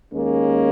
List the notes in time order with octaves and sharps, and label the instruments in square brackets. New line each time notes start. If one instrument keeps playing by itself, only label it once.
[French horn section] D#2 D#3 G#3 A#3 C#4